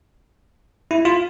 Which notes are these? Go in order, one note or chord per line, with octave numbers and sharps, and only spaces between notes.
E4
F4